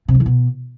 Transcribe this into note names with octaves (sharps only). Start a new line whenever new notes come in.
C3
F#3
E3
B2